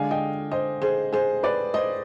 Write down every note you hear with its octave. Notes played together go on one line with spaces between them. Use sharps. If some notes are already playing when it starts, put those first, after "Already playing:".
Already playing: D3 G#3 D4 F5 G#5
D#5 G5
C5 D#5
G#4 C5
G#4 C5
B4 D5
C5 D#5